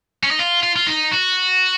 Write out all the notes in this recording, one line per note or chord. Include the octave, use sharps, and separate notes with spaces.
C#4
D#4
F4
F4
F4
D#4
F#4